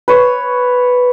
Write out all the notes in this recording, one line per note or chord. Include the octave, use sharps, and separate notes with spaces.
B4 C#5